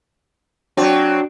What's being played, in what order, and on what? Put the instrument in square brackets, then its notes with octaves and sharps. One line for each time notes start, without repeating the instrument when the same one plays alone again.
[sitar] F#3 C4 [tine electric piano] D4 F#4 D5